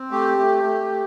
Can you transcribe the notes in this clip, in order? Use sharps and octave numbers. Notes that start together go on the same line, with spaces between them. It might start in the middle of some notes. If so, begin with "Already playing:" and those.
Already playing: C4
A3 G4
A3
A3